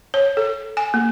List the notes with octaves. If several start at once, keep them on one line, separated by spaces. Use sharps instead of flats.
C#5
A4
G#5
A#3